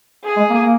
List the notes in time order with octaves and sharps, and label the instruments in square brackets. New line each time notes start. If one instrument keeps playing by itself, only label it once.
[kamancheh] G#4
[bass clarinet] G#3
A#3
A#3